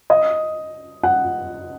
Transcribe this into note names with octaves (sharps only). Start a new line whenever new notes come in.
D#5
F#5